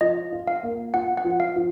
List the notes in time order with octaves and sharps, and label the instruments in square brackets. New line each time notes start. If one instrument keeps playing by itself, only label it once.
[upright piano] F3 [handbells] D#5
[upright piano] F4
[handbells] F5
[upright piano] A#3
[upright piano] F4 [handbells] F#5
[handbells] F#5
[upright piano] F3
[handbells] F5
[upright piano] F3